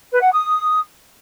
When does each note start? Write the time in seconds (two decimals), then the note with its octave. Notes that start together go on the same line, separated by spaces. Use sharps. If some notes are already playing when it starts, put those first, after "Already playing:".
0.11 B4
0.22 F#5
0.32 D#6